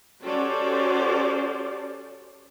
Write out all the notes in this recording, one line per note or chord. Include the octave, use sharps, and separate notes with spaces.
C#4 F#4 G4 A4 C5 D5